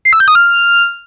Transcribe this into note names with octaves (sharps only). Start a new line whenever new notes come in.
C7
E6
G6
D#6
F6